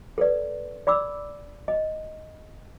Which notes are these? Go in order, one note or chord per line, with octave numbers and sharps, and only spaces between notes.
A4 B4 D5
D5 B5 D6 E6
D#5